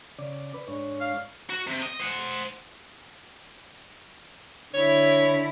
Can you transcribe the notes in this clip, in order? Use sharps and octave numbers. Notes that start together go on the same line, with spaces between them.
C#3 D5
B4
G#2 D4 C#5
F5
F#4
C3
D#5
C5 F#5
D3 E4 C#5